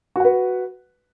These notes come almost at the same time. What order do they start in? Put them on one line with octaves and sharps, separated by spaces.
F#4 F#5 B4